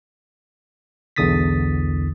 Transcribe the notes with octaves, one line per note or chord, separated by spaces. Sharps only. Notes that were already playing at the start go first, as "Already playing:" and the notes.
B1 E2 D3 D#6 A6 B6